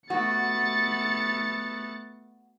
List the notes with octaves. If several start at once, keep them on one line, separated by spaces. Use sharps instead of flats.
A3 B3 F#4 A6 C#7